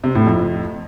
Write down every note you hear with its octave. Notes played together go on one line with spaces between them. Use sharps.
C3
A2
F2